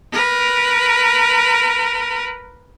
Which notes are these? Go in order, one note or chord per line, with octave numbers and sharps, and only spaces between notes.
A#4 B4